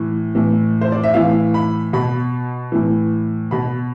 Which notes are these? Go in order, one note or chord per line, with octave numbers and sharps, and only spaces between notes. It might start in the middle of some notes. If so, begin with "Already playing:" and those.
Already playing: A2 E3
A2 E3
C5
D5
E5
A2 E3 F5
B5
B2 B5
A2 E3
B2 B5